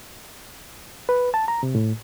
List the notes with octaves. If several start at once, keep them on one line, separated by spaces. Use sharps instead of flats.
B4
A5
A#5
C3
A2